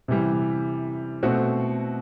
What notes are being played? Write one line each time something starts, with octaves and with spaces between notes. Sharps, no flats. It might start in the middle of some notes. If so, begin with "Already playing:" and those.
C3 E3 G3
B2 A3 C4 F#4